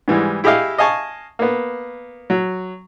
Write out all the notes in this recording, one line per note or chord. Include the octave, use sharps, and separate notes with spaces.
G#2 E3 G3 G#3
E4 G4 G#4 D#5 F5
D#5 F5 G#5 A5 C#6
A#3 B3
F#3